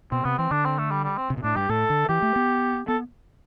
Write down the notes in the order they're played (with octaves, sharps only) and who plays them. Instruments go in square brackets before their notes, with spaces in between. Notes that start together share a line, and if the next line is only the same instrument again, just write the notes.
[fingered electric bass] B2 [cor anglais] C4
[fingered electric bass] C3 [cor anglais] B3
[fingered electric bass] E3 [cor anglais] C4
[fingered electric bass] D3 [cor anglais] D4
[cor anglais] C4
A3
G3
G3
C4
[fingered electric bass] C3
B2
[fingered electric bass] A2 [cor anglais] D4
[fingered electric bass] G2 [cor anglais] G4
[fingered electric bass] A2 [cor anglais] A4
[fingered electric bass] D3
[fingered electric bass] E3 [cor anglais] G4
[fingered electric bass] A3
B3
[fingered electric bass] B3 [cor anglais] A4